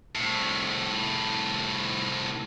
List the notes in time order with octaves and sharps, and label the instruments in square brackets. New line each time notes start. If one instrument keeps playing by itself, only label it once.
[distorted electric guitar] C2 A2